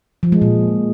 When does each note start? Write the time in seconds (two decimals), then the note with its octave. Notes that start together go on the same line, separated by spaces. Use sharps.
0.23 F3
0.32 G#3
0.42 A#2